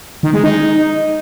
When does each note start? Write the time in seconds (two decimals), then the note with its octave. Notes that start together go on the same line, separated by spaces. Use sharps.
0.23 D#3
0.33 G#3
0.44 D#4